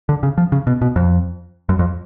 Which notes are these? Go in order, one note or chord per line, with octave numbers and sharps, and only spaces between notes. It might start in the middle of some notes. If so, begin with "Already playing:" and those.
D3
C#3
F3
C#3
B2
B2
F2
F#2
F2